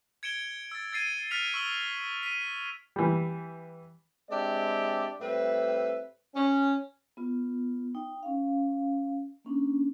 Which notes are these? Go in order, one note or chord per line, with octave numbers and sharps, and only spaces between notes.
G#6 C#7 D7 E7 G7
E6 A6
E6 G#6 A6 C7 D7 D#7
F6 A6 B6 C#7 F7
C#6 E6 F#7 G7
B6 D#7
E3 G3
G#3 C4 D4 G4 D5 E5
A2 G3 C4 B4 E5
C#4
B3 F4
D#4 G5
C#4 F5
A#3 C#4 D4